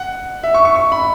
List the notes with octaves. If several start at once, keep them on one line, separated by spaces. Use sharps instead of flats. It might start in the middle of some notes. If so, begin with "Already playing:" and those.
Already playing: F#5
E5
C#6
C#6
C#6
B5